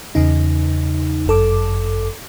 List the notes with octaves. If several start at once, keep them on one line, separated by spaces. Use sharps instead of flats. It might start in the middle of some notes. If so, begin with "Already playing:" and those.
E2 C#3 D#4
G1 F#2 A4 D6